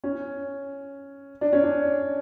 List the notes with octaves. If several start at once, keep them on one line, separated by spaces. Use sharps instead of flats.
C#4
D4
C#4
D4